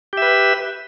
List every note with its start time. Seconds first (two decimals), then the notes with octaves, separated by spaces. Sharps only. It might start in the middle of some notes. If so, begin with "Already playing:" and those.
0.13 G4
0.17 E5
0.22 B4